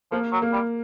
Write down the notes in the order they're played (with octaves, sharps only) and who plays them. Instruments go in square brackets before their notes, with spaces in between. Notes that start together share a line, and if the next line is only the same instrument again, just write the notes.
[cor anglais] F3 [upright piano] A#3
[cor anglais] F#3
[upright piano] A#3
[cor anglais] G3